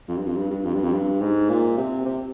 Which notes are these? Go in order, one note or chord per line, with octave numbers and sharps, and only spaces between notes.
F2
G2
F2
G2
G2
F2
G2
F2
G2
G#2
A#2
C3
C3